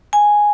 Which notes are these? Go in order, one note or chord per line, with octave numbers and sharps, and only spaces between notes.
G#5